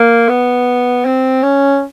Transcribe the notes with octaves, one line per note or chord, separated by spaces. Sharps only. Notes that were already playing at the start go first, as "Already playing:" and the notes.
Already playing: A#3
B3
C4
C#4